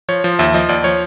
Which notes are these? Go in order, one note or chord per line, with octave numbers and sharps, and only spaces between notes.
F3 C#5
F3
D#2 E5
F3 D#5
D#2 D5
F3 C#5